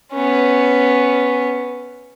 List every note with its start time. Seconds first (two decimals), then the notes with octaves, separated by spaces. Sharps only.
0.12 B3 C#4